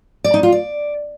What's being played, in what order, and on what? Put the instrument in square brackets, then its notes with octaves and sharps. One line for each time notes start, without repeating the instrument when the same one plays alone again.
[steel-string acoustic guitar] D5
D#4
F4
D5